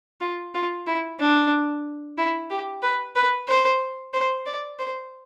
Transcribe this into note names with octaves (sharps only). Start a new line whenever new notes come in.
F4
F4
E4
D4
E4
G4
B4
B4
C5
C5
D5
C5